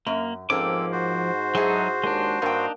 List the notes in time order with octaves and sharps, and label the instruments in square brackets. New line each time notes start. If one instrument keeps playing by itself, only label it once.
[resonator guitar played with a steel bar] F#2 [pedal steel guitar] A#3
[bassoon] G#2 [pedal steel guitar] F3 D6 [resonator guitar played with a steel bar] A#3 C#4 [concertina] C4 A4
[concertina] F#4 C5
[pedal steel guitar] F#3 D#4 A4 [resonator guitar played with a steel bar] E4 G#4
[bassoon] D#2 [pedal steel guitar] G#3 D4
[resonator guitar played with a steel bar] G2 G5 [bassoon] A#3 [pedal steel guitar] D4 D#4